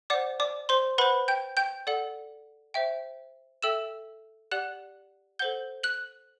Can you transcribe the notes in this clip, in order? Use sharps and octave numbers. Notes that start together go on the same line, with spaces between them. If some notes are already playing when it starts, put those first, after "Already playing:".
C5 D5 F#5 D6
D5 D6
C5 C6
B4 C5 F#5 B5
G5 G6
G5 G6
A4 D5 F#5
C5 E5 G5
A4 E5 G5 E6 E7
G4 D5 F#5 F#6 F#7
A4 C5 F#5 G6 G7
F#6 F#7